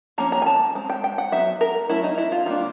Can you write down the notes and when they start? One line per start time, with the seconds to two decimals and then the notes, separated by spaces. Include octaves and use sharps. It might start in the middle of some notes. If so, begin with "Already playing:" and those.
0.18 F3 A#3 C#4 A#5
0.32 A#5
0.42 G#5
0.46 A5
0.75 G#3 C4
0.90 G5
1.04 G5
1.18 F#5
1.32 F#3 B3 D#4 E5
1.61 A#4
1.89 F#3 A3 C#4 E4
2.04 D#4
2.18 E4
2.32 F4
2.46 D#3 G3 A#3 D4 F4